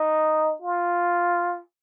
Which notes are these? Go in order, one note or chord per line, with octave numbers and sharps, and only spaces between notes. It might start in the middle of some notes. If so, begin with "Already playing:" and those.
Already playing: D#4
F4